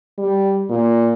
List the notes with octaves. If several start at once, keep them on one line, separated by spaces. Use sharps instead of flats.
G3
A#2